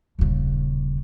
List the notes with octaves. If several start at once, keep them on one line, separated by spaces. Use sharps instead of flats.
D#1 C#3